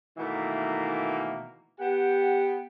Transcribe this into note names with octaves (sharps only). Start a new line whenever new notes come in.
B2 D#3 E3 A3 A#3
B3 G4 F#5 G5